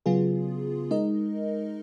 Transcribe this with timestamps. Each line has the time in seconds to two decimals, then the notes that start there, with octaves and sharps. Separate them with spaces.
0.06 C#3 F#3 B3 F4 G#4
0.91 G#3 D#4 A#4 D#5